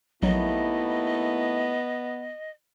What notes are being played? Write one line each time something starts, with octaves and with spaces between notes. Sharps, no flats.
A#1 D#2 F#3 A3 B3 E4 D#5